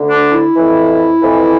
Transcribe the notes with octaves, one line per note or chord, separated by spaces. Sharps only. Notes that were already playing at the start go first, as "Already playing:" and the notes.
Already playing: D2 D3
D4
E4
F2 E3
F2 E3